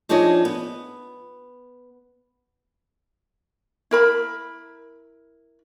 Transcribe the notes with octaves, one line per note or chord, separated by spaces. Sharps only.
F3 D4 D#4 G#4 C#5 D#5
B3
E4 A#4 B5